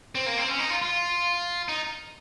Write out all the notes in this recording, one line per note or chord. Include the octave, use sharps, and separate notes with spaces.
C4
A#3
C4
C#4
D#4
F4
F4
D#4